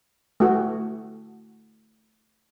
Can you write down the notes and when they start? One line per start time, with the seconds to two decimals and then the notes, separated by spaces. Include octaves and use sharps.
0.40 A3 F#4